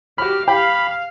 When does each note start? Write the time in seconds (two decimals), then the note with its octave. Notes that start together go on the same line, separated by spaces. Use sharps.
0.18 F#4 G4 B5 F6
0.48 G4 F5 B5